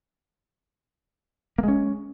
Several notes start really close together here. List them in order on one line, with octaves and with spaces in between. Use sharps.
A#3 G#3 C#4